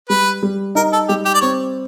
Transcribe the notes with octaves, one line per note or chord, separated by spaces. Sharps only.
G3 B4
G3
D#4 A#4
A4
G3 G4
G4
D5
C4 C#5